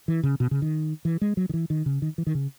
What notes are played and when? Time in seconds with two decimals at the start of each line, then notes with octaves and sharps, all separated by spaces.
0.08 E3
0.23 C#3
0.40 B2
0.51 C#3
0.62 D#3
1.05 E3
1.21 G#3
1.37 F#3
1.49 D#3
1.54 E3
1.70 D#3
1.86 C#3
2.02 D#3
2.18 E3
2.27 D#3
2.35 C#3